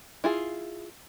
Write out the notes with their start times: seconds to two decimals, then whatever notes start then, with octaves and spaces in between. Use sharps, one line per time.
0.24 E4 F4 G#4